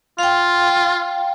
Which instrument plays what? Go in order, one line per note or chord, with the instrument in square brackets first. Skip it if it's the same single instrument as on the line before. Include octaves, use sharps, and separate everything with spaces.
[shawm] F4 [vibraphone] F5 G5